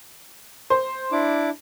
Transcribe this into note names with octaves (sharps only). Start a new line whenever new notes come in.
C5
D4 E4 D6